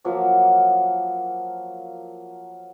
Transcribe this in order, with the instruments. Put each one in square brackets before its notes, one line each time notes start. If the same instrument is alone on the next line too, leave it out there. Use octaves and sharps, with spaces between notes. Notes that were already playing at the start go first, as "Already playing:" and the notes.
[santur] F3 F#3 A#3 D6